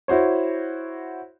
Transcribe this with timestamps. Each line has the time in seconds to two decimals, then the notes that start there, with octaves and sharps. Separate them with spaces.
0.08 E4 F#4 C5 C#5